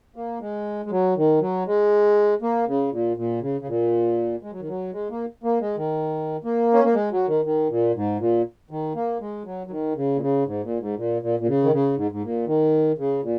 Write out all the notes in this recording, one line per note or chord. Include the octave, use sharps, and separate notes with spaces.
A#3
G#3
G#3
F#3
D#3
F#3
G#3
A#3
C#3
A#2
A#2
C#3
C#3
A#2
G#3
F#3
D#3
F#3
G#3
A#3
A#3
G#3
D#3
A#3
C#4
A#3
G#3
F#3
D#3
D#3
A#2
G#2
A#2
D#3
A#3
G#3
F#3
F#3
D#3
C#3
A#2
C#3
G#2
A#2
G#2
A#2
A#2
A#2
C#3
D#3
C#3
G#2
G#2
A#2
D#3
C#3
A#2